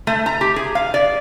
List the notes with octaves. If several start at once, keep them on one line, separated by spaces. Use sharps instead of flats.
A3
A#5
G4
G#4
F5
D5